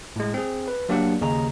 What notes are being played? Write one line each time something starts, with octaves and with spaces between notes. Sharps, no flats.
A2 G#3
C4 G#4
B4
F#3 A#3 D4 G4 D5 F#5
D#2 C#3 G#4 D#5 A#5